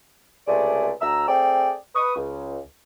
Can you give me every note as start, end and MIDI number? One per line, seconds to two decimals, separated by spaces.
0.47 0.91 37
0.47 0.91 48
0.47 0.91 57
0.47 0.91 68
0.47 0.91 74
1.01 1.27 38
1.01 1.27 82
1.01 1.27 88
1.28 1.73 57
1.28 1.73 60
1.28 1.73 68
1.28 1.73 74
1.28 1.73 79
1.95 2.15 71
1.95 2.15 85
1.95 2.15 87
2.16 2.59 37